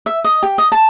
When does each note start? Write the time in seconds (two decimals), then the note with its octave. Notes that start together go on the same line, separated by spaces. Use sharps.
0.06 E5
0.24 D#5
0.43 G4
0.58 D#5
0.72 A5